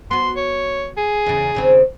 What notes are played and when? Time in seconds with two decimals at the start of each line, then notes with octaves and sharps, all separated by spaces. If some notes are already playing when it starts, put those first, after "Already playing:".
0.11 B3 F#4 C6
0.36 C#5
0.97 G#4
1.26 E2 C#3
1.55 D#2 C#3 C4